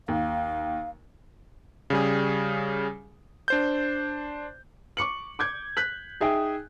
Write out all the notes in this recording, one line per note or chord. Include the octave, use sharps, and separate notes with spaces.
D#2 F5
C#3 G3 G#4
D4 C5 G6
C#6 D6 C#7 F#7
D6 G6 G#6
F#6 G6 B6 F#7
D#4 G#4 E5 G5 G#5